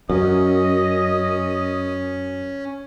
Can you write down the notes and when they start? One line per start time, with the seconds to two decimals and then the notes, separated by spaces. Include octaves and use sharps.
0.10 F#2 C#4 D#5